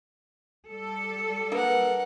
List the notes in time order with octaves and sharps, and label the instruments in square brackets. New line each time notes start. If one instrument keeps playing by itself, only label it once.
[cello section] G3 A4
[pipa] A#3 [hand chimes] D4 B4 [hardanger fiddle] A#4 F#5